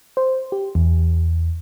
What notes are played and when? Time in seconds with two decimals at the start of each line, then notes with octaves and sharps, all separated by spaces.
0.17 C5
0.52 G4
0.75 E2